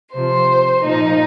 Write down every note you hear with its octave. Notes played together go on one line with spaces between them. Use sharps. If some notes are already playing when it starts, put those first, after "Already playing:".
C3 F3 C5
A#2 F3 D#4